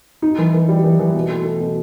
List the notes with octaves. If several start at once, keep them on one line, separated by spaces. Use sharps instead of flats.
D#4
E3
E3
G3
E3
E3
B2
A3
A3
B2